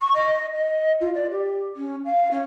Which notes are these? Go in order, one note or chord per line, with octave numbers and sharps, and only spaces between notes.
C#6
D#5
D#5
F4
D5
G4
C#4
F5
C#4